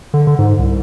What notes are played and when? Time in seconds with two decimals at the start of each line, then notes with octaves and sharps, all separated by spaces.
0.14 D3
0.27 D3
0.39 G#2
0.59 C2